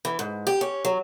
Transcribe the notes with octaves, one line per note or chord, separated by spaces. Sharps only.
E3
G#2
G4
C#4
F#3